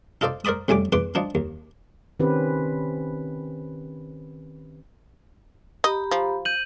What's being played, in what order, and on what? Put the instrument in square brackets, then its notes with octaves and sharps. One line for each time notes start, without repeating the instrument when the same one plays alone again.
[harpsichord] D#4 F4 A4 C5 D5
A#4 C5 D5 B5 D#6
F2 A2 G3 G#5 D6
E2 B4 C6 D6
F3 D4 D#4
D#2
[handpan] D#3 C4 C#4 G4 B4
[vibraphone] G4 A#5 B5 [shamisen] D#5
[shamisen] F3
[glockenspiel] G6 D#7 F#7